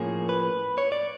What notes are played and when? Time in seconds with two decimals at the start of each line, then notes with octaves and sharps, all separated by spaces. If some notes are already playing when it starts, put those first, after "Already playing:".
Already playing: A2 F3 A#3 C#4 G#4
0.29 B4
0.78 C#5
0.92 D5